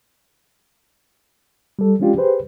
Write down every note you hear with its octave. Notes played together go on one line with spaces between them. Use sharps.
G3 A4
F3 G#3 C#4 D4 F4 G4
G4 G#4 B4 C5